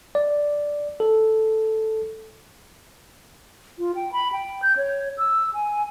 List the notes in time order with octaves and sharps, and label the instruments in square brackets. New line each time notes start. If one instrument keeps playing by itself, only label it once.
[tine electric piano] D5
A4
[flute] F4
G5
B5
G5
G6
C#5
E6
G#5